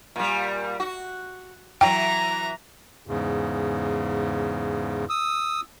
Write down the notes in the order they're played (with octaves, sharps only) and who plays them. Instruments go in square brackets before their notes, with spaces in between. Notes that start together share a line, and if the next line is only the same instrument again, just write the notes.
[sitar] A#2 G3
F#4
[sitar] E3 F#3 [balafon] G5 [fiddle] A#5
[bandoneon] E2 G#2 C#3
D#6 E6